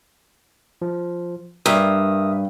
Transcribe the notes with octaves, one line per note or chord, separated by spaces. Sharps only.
F3
G2 A#4 E5 D#6